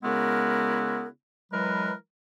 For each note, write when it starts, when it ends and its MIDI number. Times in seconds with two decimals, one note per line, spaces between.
0.03 1.06 49
0.03 1.06 56
0.03 1.06 59
0.03 1.06 64
0.03 1.06 66
0.03 1.06 70
1.52 1.92 52
1.52 1.92 54
1.52 1.92 56
1.52 1.92 70
1.52 1.92 71